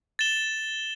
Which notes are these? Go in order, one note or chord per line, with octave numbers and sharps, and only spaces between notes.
A6 E7 G7